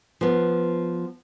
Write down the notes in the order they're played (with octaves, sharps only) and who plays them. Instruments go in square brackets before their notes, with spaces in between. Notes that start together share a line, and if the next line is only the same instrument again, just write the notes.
[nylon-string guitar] F3 B3